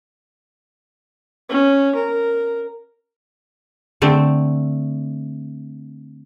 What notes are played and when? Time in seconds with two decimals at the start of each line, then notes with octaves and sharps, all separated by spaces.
1.49 C#4
1.95 A#4
4.02 D3 A3 C4